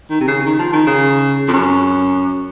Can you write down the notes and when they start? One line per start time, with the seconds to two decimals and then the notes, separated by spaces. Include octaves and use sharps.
0.10 D#3
0.21 C3
0.28 C#3
0.45 D#3
0.59 F3
0.73 D#3
0.87 C#3
1.48 F2
1.53 F#2